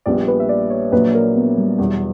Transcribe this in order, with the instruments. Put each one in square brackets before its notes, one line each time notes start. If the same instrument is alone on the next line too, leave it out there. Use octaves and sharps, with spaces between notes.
[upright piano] A#1 A#2 G3 B3 [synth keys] D5
[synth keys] B4
E5
D5
C#5
[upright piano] A#1 A#2 F#3 [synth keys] B4
[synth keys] A#4
B3
G3
[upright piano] E2 B2 F#3 B3 E4 [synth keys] G3